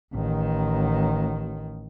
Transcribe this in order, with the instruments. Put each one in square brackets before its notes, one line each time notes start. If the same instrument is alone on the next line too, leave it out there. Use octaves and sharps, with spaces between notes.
[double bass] A1 D#3